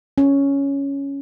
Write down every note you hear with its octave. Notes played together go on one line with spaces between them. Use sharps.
C#4